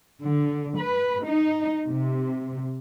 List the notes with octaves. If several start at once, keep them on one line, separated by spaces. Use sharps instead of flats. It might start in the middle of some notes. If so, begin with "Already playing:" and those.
D3
B4
D#4
C3